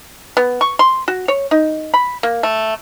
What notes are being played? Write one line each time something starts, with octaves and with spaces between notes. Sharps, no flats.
B3
C#6
C6
F#4
C#5
D#4
B5
A#3
A3